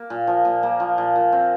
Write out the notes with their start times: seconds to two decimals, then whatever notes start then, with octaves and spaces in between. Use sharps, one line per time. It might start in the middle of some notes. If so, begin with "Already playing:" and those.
Already playing: A#3
0.10 A#2
0.27 F3
0.45 A#2
0.63 A#3
0.80 F3
0.98 A#2
1.16 A#2
1.32 C4